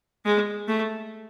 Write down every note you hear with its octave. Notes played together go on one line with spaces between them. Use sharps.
G#3
A3